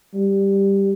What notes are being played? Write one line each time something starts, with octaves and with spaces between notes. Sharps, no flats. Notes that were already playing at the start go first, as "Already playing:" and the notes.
G3